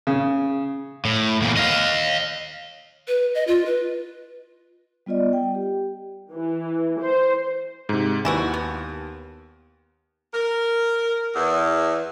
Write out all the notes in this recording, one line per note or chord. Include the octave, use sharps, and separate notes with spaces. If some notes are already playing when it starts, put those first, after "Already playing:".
C#3
A2
E2 A#2
D#5 F5
B4
D#5
F4
B4
G3 B3 F4 D5 D#5
G5
G4
E3
C5
G#2 C3
D#2 E3 E4 F#4
B3
A#4
E2